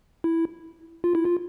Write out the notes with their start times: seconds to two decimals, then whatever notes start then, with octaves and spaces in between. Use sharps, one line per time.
0.24 E4
1.04 F4
1.15 E4
1.25 F4